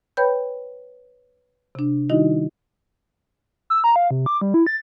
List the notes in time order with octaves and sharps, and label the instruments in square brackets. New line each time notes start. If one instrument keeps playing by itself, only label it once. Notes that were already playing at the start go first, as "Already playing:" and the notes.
[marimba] B4 C#5 G5 B5 G6
C3 D4
D#3 G3 D#4 E4 F#4 D#5
[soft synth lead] E6
A#5
F5
C3
D6
G3
E4
A6